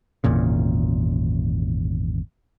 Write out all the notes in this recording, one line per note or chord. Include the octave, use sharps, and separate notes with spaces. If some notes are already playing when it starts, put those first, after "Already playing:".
G#1 E2 A#2 C#3